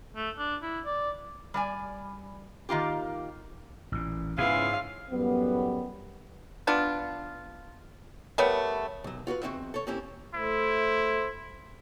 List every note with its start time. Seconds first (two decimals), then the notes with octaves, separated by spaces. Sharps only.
0.16 A3
0.38 D4
0.62 E4
0.85 D5
1.54 G3 D5 G#5
2.69 D#3 A#3 F4 G4
3.92 A1 A#2
4.38 G#2 C#3 B3 C#4 E4 F4 G#4 F5
5.10 F#2 A2 G3 B3
6.67 B3 D4 F4
8.38 G3 A3 B3 A#4 C#5
9.04 B1 F#3
9.27 F4 F#4 A#4 B4
9.42 E2 C3 C4 F#4 D#5 E5
9.74 A4 C#5
9.87 A#3 C4 C#4 E4 G4
10.35 A3 E4 C5